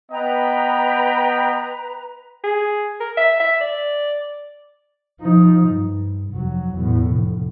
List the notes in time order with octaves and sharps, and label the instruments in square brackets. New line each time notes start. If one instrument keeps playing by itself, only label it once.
[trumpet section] B3 D#5 G5 [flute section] B4 A#5
[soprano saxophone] G#4
A#4
E5
E5
D5
[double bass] F3 D#4
G2
F1 F#3
E2 A2
F1